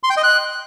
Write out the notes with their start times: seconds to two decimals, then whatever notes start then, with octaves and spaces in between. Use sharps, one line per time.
0.03 C6
0.10 G5
0.17 D#5
0.24 F#6